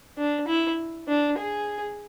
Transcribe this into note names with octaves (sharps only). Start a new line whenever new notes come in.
D4
E4
D4
G#4